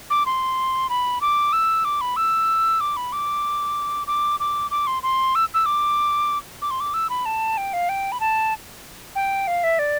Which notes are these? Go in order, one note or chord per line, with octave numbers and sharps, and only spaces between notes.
D6
C6
B5
D6
E6
D6
B5
E6
D6
B5
D6
D6
D6
D6
C6
C6
E6
E6
D6
D6
C6
D6
E6
B5
A5
G5
F5
G5
B5
A5
G5
F5
E5
D5